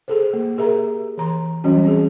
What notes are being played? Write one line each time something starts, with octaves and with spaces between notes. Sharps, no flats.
G#4 A4 C5
A#3
G4 G#4 A#4 E5 A#5
E3 A#5 C6
E3 F#3 G3 C#4 F#4
C4 G#4